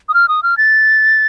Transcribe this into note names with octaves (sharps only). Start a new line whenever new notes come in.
D#6
F6
D#6
F6
A6